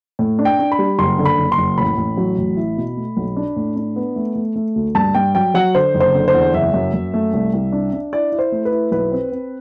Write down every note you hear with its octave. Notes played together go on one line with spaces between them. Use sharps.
A2
D4
G5
D4
B5
G3
F#1 C6
D3
B5
F#1
C6
F#1
A1 B5
A1
F#3
A1
E4
B2
A3
B1
D4
A2
D4
B3
A3
A3
A3
D2
G2 A5
G2 G5
F#3 G5
F#3 F#5
D3 C5
F#1
C5
D3
C5
E2
F#1 E5
F#2
F#2
A3
C2
C2
D4
D4
E4 D5
E4
C5
A3
B4
E4
B1 B4
C4
C4